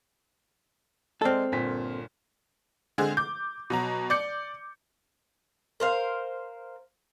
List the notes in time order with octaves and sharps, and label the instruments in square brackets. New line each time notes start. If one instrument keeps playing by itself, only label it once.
[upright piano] G#3 D5 F6 [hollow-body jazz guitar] C4 A4
[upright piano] G1 A#2 B6
[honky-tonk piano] D3 G#3 C4 G#4 C5
D6 G6
B2 F#3 A#5
D5 D6 G6 C#7
[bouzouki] A#4 C5 F5